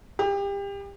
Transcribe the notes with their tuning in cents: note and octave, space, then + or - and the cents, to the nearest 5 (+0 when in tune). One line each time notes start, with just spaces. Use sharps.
G4 +30